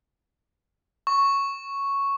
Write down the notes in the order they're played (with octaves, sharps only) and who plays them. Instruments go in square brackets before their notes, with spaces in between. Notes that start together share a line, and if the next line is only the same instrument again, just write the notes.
[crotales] C#6